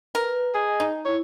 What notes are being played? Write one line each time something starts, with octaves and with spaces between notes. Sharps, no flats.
A#4 B4
G#4 D#5 G#5
D#4
E4 C#5